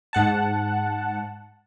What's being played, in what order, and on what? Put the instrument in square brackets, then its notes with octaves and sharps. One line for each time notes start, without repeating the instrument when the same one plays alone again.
[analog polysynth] G#2 F#5 A5